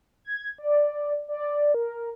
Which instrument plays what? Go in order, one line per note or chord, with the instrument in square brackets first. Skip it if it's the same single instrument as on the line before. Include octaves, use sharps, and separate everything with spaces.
[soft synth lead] G#6
D5
D5
A#4